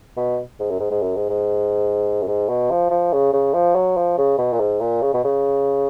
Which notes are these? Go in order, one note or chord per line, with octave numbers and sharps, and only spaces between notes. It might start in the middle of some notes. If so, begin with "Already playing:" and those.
B2
G#2
F#2
G#2
G#2
F#2
G#2
G#2
F#2
G#2
B2
F3
F3
C#3
C#3
F3
F#3
F3
C#3
B2
A#2
G#2
A#2
C#3
B2
C#3